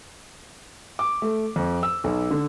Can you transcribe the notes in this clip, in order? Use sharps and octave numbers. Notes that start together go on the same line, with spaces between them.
D6
A3
F2
E6
B1
D3